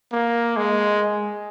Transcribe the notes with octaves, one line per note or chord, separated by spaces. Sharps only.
A#3
G#3